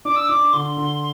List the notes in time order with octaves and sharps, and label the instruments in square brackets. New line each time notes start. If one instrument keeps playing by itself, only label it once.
[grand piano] D4 [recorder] D6
[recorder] E6
[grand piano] D4 [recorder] D6
[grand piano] D3 [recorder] C6
[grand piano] D3